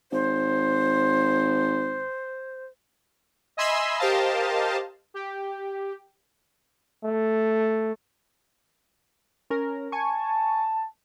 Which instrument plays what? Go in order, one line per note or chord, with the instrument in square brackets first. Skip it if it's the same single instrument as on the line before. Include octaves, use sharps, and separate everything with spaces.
[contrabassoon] G#1 [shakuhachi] C5
[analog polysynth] D#5 E5 G#5 B5 C6 E6
G4 A#4 C5 D#5 F5 A5
G4
[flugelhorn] A3
[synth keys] C#4 A#4
[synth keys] G#5 C#6 [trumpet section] A5